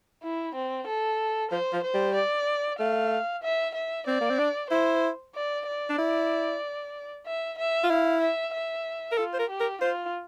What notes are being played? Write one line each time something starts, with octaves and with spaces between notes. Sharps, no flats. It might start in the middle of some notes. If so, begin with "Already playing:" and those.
E4
C4
A4
F3 C5
F3
C5
G3
D5
A3 F5
E5
E5
C4 D5
A#3
C4
D4
E4 C5
D5
D5
D4
E4
E5
E5
F4
E4 F5
E5
E5
A#4
F4 A4
C5
A#4
G4
A#4
F4 C5